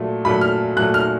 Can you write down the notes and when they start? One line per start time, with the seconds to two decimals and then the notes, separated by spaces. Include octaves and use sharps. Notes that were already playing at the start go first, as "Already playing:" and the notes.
Already playing: A#2 F#3 A3
0.25 A#2 F#3 A3 B5
0.41 F6
0.76 A#2 F#3 A3 F#6
0.94 F6